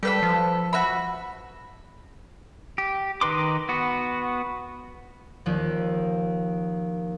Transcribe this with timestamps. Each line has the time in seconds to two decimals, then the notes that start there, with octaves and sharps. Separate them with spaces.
0.03 G3 A4 B4 B5
0.23 F3
0.73 F#4 E5 B5
2.78 G4
3.21 D#3 D#4 B4 C6 D6
3.69 B3 F#4
5.46 D#2 F3